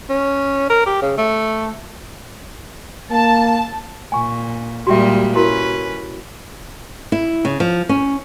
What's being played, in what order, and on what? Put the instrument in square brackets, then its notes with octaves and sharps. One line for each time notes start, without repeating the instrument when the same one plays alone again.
[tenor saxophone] C#4
A#4
G4
C#3
A3
[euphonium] A#3 [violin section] A5
[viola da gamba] A#2 [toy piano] G#5 C#6
[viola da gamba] A#2 G3 G#3 [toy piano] F#4 G4 E5
[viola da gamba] C#4 B4 [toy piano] E4 F#4 A#4
[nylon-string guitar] E4
C#3
F3
C#4